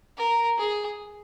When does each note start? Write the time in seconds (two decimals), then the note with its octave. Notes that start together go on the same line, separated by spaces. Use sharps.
0.18 A#4
0.58 G#4